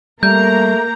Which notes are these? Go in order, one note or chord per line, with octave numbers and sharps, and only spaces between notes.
G3 A3 A#3 A#4 A#5 G6